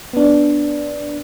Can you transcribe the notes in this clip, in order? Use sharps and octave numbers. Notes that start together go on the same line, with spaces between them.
B3 D4